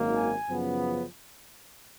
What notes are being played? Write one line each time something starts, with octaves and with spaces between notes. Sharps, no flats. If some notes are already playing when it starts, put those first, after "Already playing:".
Already playing: G#1 F#2 D#3 A#3
G#5
F#2 C#3 F3 B3